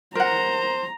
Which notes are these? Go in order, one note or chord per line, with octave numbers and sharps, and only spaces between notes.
A#4 C5 F#5 A#5